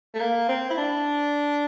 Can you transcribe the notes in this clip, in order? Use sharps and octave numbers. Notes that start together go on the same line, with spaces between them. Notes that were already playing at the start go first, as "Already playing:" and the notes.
A3
A#3
C4
E4
D4